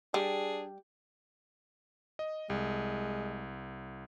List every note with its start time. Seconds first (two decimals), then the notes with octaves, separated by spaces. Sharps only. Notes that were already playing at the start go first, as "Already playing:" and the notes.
0.14 G3 D4 G#4
2.19 D#5
2.50 C2 G#3